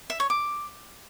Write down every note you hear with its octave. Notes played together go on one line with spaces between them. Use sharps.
E5
C#5
D6